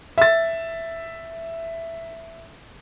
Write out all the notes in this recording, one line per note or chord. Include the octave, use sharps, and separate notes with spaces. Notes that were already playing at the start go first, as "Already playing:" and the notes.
E5 A6